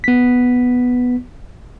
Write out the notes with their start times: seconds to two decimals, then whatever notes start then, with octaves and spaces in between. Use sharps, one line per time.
0.04 B3 B6